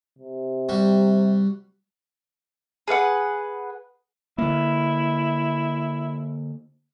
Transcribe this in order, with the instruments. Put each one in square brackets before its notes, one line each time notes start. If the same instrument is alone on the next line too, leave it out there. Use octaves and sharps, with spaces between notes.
[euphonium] C3
[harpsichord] G3 F#4
[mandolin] G#4 B4 F5 F#5
[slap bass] D3 A#3 [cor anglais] E4